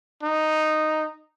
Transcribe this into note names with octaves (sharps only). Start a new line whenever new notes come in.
D#4